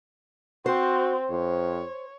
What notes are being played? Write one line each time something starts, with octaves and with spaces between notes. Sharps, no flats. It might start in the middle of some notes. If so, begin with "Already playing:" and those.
C4 F#4 C5
F2 C#5